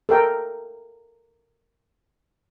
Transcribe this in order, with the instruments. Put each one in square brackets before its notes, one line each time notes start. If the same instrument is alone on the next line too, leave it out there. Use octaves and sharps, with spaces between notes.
[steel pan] A4 A#4 G5